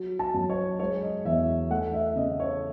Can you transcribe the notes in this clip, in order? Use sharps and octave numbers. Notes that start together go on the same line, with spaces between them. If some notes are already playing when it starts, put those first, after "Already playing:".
Already playing: F#3
A5
F#2
C#5
G#3 C#5
D#5
E2 E5
A3 F#5
E5
C#3 D#5
C#5